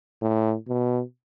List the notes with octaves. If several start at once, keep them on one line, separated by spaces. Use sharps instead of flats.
A2
B2